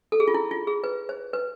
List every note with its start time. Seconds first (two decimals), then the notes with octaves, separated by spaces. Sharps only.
0.12 A4
0.20 G#4
0.28 F4
0.34 E4
0.51 F4
0.67 G#4
0.84 B4
1.09 C5
1.33 B4